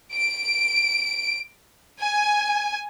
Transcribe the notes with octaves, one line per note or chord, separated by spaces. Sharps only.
D7
G#5